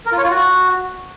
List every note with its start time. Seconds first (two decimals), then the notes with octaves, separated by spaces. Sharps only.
0.06 A#4
0.12 F4
0.18 C#5
0.24 F4
0.30 F#4